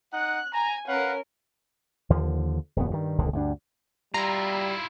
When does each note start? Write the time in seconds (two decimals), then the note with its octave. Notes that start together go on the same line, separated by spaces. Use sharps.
0.13 D#4 F#5 F#6
0.53 G#5 A#5
0.88 C#4 A#4 B4 F5 F#5
2.10 D#2 D3 F3
2.76 D1 F2 B3
2.91 G2 D#3
3.18 D#1 C#2 D3 D#3
3.33 D2 G2 D4
4.14 G3 E4 F4 A#5